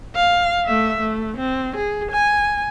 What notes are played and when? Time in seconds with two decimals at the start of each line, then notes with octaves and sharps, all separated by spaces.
0.15 F5
0.65 A3 E5
1.01 A3
1.37 C4
1.76 G#4
2.12 G#5